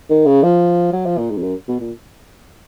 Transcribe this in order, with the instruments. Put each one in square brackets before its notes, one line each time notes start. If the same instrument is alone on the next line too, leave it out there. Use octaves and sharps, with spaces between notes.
[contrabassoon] D#3
C#3
F3
F#3
F3
A#2
G#2
F2
F#2
B2
A#2